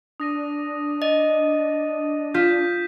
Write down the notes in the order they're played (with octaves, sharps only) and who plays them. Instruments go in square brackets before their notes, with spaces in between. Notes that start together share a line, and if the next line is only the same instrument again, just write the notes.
[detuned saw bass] D4 [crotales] D#6 A#6 D#7
[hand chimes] D#5 [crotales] A6 D#7
[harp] F4 [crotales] G6 B6 E7